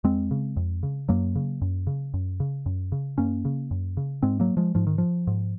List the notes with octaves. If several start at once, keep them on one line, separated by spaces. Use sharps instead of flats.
F2 G#3 C4
C#3
F2
C#3
F#2 F#3 A#3
C#3
F#2
C#3
F#2
C#3
F#2
C#3
F#2 A#3 C#4
C#3
F#2
C#3
G#2 G#3 C4
F#3 A#3
F3 G#3
G#2 F3
D#3
F3
G#2